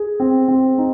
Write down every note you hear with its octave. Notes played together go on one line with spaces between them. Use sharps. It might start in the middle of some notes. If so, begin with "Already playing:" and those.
Already playing: G#4
C4
C4
D#4